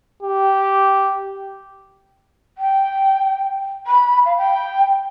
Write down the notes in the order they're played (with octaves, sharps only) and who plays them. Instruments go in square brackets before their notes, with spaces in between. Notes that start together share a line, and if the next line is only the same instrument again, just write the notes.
[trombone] G4
[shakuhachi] G5
B5
F5
G5